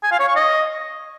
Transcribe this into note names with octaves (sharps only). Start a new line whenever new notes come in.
G#5
F5
C#5
C#6
D#5